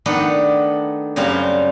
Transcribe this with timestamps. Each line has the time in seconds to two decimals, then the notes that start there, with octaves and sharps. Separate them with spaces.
0.06 D#3 A3 B3 D4 A4
1.16 F#2 C#3 G3 C4 F5 C6